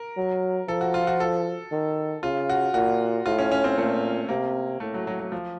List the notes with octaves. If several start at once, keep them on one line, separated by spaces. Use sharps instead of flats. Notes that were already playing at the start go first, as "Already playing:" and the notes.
Already playing: A#4
F#3
F3 A4
F#4
F4
F#4
A4
D#3
C#3 F4
F#4
A#2 F#4
A2 F4
C#4
C#4
C4
A#2 A3
C3 A#3
A2 A3
F#3
F#3
F#3
F3